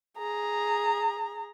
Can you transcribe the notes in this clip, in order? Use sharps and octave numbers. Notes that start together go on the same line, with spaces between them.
G#4 A#5